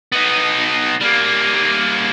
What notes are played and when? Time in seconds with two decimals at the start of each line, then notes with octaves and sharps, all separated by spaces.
0.12 B3 D#4
1.01 G3 A#3